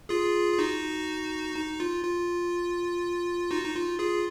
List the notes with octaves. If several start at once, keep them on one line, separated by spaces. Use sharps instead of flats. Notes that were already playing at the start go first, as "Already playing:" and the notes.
F4 G#4
G#4
D#4 F#4
D#4
F4
F4
D#4 F#4
D#4
F4
F4 G#4